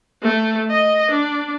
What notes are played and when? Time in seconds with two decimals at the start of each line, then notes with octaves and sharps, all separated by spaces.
0.22 A3
0.70 D#5
1.10 D4